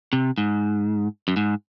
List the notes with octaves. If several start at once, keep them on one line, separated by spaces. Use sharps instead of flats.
C3
G#2
F#2
G#2